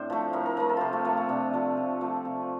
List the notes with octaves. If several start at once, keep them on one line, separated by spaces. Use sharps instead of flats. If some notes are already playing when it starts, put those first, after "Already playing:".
Already playing: A2 C4 D4 C5
F3 A3
A2 A#4
A#4
F3 A3 A#4
A4
C3 F4 G4
A3
F3 A3 A#3
A3
C3 D4
F3 A3
C3
F3 A3
C3